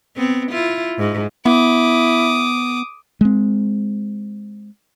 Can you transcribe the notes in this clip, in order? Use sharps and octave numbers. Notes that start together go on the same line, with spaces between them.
B3 C4
E4 F4
G#2
B3 E4 D6 D#6
G#3 C4